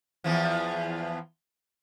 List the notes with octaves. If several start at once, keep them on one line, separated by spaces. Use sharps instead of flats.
E2 E3 F3